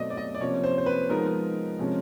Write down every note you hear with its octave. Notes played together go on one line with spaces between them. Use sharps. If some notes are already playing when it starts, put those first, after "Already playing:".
Already playing: B2 F#3 A3 C4 D5 D#5
D5
D#5
D5
C3 F3 A#3 C#4 C#5
C5
C5
B4
F3 G#3 B3 D#4 A#4
C3 F3 G#3 C#4